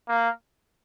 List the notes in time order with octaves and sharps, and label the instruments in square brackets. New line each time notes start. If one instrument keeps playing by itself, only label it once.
[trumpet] A#3